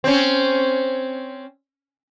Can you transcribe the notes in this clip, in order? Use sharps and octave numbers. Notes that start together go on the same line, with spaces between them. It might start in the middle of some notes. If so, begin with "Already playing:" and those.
C4 C#4